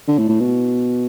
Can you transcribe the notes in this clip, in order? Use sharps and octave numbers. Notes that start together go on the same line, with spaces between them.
D3
A2
A2
B2